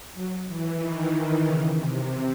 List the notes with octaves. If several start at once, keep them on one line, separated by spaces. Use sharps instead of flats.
F#3
E3
D#3
C#3
C3